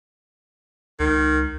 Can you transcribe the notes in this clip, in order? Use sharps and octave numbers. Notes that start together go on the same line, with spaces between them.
C#2 D#3